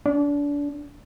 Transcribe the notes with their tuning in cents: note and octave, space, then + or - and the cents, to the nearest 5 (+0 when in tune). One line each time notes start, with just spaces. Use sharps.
D4 -30